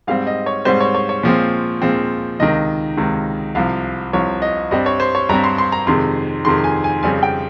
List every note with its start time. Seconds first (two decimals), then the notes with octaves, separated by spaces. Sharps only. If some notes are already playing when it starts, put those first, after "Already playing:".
0.07 G#2 G3 C4 F5
0.27 D#5
0.46 C#5
0.65 G#2 G3 C4 C5
0.80 C#5
0.94 C#5
1.09 C#5
1.23 A#2 F3 G#3 C4
1.82 A#2 F3 G#3 C4
2.40 C#2 C3 D#3 D#5
2.97 C#2 C3 D#3
3.55 C2 C3 F3 F5
4.13 C2 C3 F3 C#5
4.42 D#5
4.71 G2 G3 C4 D#5
4.86 C#5
5.00 C5
5.15 C#5
5.29 G2 G3 C4 A#5
5.44 C6
5.58 C6
5.72 A#5
5.87 F2 C3 D#3 G#3 C6
6.45 F2 C3 D#3 G#3 C6
6.64 G#5
6.84 G#5
7.03 F2 C#3 G3 C4 G#5
7.23 G5